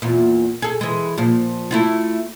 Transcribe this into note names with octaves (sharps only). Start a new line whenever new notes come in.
E2 A#2
G#4 A4
E3 G#3
A#2 F3
A3 E4 F4